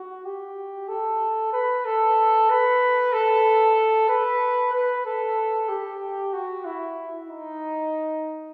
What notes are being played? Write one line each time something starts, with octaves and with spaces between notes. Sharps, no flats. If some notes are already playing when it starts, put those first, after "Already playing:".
Already playing: F#4
G4
A4
B4
A4
B4
A4
B4
B4
A4
G4
F#4
E4
D#4